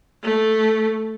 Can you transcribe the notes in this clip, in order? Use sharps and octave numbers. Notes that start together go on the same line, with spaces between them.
A3